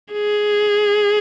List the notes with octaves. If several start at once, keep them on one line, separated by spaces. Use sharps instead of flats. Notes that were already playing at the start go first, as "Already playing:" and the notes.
G#4